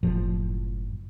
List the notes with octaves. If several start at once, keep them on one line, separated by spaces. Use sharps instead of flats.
F#1 A2 F3